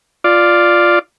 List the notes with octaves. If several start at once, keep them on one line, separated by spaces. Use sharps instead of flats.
F4 D5